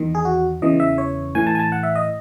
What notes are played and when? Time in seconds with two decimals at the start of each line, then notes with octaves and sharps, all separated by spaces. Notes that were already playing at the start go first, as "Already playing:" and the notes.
Already playing: E2 D#3
0.15 G#4
0.25 F#4
0.62 E2 C#3 E3 D#5
0.80 E5
0.98 C#5
1.35 A2 E3 G#5
1.47 A5
1.55 G#5
1.59 A5
1.72 F#5
1.83 E5
1.95 D#5